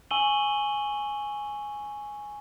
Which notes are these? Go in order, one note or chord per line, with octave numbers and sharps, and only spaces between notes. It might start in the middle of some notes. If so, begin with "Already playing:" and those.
G#5 C#6 E6 D#7 F#7 G7